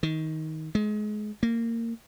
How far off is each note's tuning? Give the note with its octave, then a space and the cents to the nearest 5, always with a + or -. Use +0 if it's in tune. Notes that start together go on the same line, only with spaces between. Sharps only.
D#3 +20
G#3 +30
A#3 -20